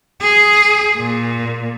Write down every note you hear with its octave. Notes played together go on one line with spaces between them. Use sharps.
G#4
A#2